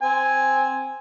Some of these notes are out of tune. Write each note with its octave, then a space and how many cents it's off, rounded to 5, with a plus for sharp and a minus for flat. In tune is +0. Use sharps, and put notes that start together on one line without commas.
C4 +0 G#5 +0